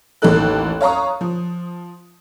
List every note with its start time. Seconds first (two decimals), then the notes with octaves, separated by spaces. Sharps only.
0.22 A1 D#2 A#3 D#4 A4 F#6
0.81 C#5 F5 A#5 C#6 D#6
1.21 F3